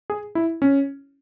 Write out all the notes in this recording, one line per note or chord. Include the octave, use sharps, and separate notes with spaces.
G#4
E4
C#4